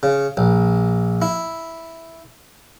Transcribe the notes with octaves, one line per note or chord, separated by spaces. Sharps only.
C#3
A#1
E4